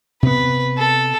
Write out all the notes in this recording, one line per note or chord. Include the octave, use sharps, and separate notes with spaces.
C3 B3 B4
A4